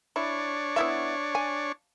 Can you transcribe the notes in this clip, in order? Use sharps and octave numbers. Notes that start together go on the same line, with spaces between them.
D4 E4 C#5
B3 E4 E5
G#5